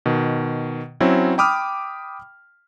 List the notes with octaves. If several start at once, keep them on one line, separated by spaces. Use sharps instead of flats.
B2 D#3
F#3 C4 C#4 E4
G5 B5 D6 D#6 F6